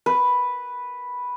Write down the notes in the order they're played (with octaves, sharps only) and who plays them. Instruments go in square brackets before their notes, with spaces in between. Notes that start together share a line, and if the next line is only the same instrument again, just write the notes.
[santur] B4